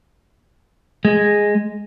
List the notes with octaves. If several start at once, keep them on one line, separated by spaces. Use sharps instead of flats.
G#3